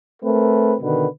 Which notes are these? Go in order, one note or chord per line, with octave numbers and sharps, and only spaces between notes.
A3 C4 A#4 B4
B2 D3 D#3 B4